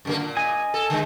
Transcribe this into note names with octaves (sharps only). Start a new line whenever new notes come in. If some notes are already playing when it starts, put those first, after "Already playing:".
F#2 D3 A#3
A#2
D#5 G#5
A4
D3 G#3